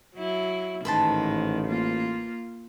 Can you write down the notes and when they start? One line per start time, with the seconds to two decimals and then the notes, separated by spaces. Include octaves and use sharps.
0.16 F#3 E4
0.85 A1 G#2 D#3 B4 C5 A5
1.67 A#3 F4